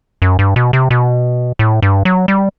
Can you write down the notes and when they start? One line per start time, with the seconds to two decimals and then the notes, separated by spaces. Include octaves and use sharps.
0.22 F#2
0.39 G2
0.56 B2
0.73 C3
0.91 B2
1.59 A2
1.82 G2
2.05 F#3
2.28 G3